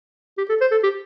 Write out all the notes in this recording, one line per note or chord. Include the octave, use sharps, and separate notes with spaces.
G4
A4
C5
A4
G4